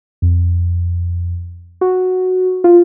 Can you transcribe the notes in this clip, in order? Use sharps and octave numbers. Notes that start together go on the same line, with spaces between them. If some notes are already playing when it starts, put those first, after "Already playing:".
F2
F#4
F4